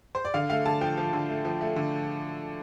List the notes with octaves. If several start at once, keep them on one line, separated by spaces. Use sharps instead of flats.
C5
D5
D3 F5
A3 F5
D3 A5
F3 G5
F3
D3
A3
F3
A3
D3